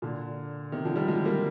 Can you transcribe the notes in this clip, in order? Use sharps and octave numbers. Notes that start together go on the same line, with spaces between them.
A#2 D3
C3 D#3
D3 F3
D#3 G3
F3 G#3
G3 A#3